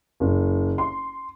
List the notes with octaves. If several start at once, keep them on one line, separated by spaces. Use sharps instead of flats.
F#1
C6